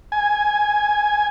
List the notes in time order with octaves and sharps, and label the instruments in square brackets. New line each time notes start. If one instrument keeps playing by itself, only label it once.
[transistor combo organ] G#5